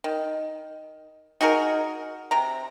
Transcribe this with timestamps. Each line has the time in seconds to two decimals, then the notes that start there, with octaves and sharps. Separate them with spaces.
0.04 D#3
1.41 D#4 F#4 G#4 A#4
2.31 C3 A#5